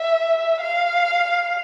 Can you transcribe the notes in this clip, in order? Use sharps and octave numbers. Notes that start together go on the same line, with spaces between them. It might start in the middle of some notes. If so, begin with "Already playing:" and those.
Already playing: E5
F5